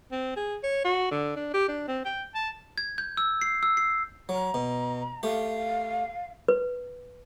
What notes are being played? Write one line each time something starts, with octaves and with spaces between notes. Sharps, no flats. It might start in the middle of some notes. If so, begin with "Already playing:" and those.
C4
G#4
C#5
F#4
D3
D4
G4
D4
C4
G5
A5
G#6
G6
E6
C7
E6
C7
F#3 A#5
B2
A3 G4 F5
B4